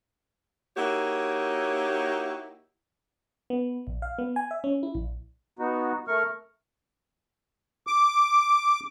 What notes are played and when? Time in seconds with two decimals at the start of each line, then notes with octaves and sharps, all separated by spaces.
0.77 A#3 D#4 E4 F#4 G4 C#5
3.50 B3
3.87 A#1
4.02 F5
4.19 B3
4.36 G#5
4.51 E5
4.64 C#4
4.83 E4
4.95 A#1
5.59 B3 D#4 F#4
6.08 A3 A#4 C#6 F6
7.87 D6